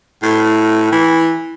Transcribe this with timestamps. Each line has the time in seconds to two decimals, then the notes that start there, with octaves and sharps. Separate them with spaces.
0.23 A2
0.92 E3